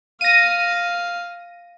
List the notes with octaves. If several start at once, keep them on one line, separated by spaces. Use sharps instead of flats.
F5 A#6 D#7